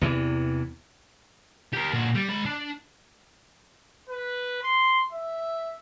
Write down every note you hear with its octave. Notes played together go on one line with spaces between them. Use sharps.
E2 C3 E3
G4 A#4
A#2 F#4
G3
G#3 B5
D4
B4
C6
E5